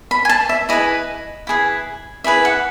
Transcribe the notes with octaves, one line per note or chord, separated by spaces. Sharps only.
B5
G#5
A5
E5
E4 G#4 B4 D#5
E4 G#4 B4
E4 G#4 B4 E5
F#5